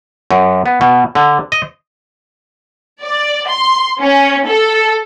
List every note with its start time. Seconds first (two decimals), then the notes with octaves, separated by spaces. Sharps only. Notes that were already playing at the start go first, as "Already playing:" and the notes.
0.31 F#2
0.66 B3
0.81 B2
1.15 D3
1.52 D#5
3.02 D5
3.48 C6
4.00 C#4
4.47 A4